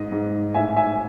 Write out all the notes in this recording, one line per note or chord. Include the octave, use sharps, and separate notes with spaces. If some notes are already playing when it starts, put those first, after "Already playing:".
Already playing: G#2 D#5
G#2
A2 E5 G#5
E5 G#5